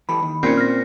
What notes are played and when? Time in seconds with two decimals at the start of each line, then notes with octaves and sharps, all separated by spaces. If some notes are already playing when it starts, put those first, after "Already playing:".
0.09 E3 G4 A4 B5
0.20 D#2 D#3
0.43 A#2 C4 C#4 D#4 G4 C5
0.57 C4 F6 A#6